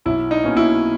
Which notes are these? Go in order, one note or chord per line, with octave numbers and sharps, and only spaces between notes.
B1 E4
D#4
B2 A#3 C#4
E4